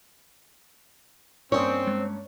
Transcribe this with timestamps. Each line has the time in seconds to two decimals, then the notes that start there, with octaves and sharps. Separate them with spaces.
1.52 G2 A#3 C4 C#4 C#5 D5 G#5 D#6
1.87 G#3